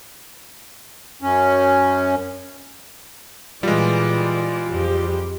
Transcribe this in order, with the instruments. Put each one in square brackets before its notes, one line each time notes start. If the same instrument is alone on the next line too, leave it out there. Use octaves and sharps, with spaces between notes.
[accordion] F#2 C#4
[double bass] A#2 E3 [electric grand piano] G3 G#3 [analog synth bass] F4 [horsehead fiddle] D5
[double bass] F2 [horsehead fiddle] G4